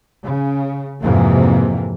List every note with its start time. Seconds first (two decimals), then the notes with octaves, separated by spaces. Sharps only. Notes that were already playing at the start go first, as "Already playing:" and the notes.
0.24 C#3
1.02 F2 G#2 C3 E3 A#3